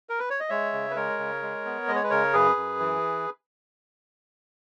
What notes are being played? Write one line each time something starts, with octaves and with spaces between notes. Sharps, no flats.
A#4
B4
C#5
D#5
G#3 C#5 E5
C#3
B4
G#3 A#4 C#5
C#3
G#3
B3
G#3 D#5
C#5
B4
C#3 A#4 C#5
F#2 G#4 B4
F#2
E3